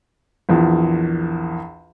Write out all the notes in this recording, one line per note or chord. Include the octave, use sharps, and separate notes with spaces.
A#1 E2